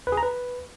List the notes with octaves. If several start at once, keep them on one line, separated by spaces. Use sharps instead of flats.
B4
G#4
A#5
B4